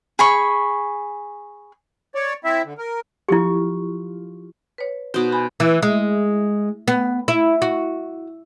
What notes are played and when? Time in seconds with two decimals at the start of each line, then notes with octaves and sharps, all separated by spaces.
0.19 G#4 B5 C#6
2.15 C#5 D5
2.44 C4 E4 E5
2.65 D3
2.78 A#4
3.29 F3 E4 G4 C#6
4.78 B4 C#5
5.14 B2 B3 D#4 F#4 C5
5.32 G#5 B5
5.60 E3
5.83 G#3
6.88 B3
7.28 E4
7.62 F#4